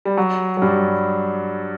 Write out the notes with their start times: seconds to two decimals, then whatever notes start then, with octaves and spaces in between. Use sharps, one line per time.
0.05 G3
0.17 F#3
0.57 F#3
0.62 G2 G3